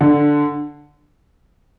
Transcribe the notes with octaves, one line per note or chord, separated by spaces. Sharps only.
D3